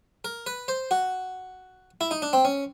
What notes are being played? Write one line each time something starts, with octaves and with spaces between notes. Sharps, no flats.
A#4
B4
C5
F#4
E4
D#4
D4
C4
C#4